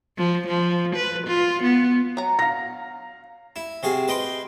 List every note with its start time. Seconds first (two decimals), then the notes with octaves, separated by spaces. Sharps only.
0.18 F3
0.48 F3
0.96 B4
1.27 F4
1.63 B3
2.17 F#3 A#5
2.39 F5 A#6
3.56 E4
3.83 C3 F#4 G#4 F5
4.08 B4 D#5 G5 C6